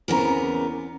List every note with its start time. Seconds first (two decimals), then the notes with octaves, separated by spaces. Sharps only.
0.08 E2 C#3 B3 C4 A#4 A#5